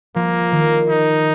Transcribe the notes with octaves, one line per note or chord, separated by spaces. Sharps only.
F3 A#3
D#3
D#4